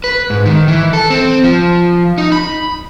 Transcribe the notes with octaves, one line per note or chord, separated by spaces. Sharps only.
B4
G#2
D#3
E3
A4
C4
F3
D#4
B5